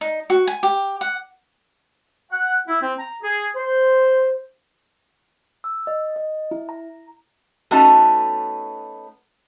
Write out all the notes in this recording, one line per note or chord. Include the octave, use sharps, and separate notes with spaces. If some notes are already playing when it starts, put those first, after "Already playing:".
D#4
F#4
G#5
G4
F#5
F#5
E4
C4
A#5
G#4
C5
E6
D#5
D#5
E4
A#5
A3 B3 C#4 D#4 F#4 A4